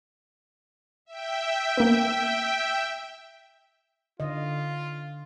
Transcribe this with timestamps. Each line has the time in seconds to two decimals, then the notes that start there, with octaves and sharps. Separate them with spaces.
1.05 E5 G5
1.77 A#3 B3
4.20 D3 F4 D#5